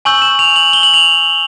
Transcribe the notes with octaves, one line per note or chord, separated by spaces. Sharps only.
G#5 C#6 E6 G6 F#7
E7
F7
F#7
G7
F#7
F7
F#7